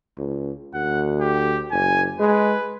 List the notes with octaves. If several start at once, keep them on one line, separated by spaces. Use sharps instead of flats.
C#2
D2 F#5
G4
F#1 G#5
G#3 B4